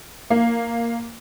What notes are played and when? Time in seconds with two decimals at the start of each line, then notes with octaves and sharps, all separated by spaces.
0.30 A#3